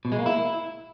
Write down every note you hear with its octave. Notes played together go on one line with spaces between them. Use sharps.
B2
G#3
A#3
E4